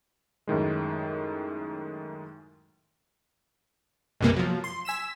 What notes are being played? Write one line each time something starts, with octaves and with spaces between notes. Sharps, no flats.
F#2 A2 D#3 G#3
B1 F#2 C3 G3 A#3 B3
F3 F#3
C6
G#5 E6 B6 E7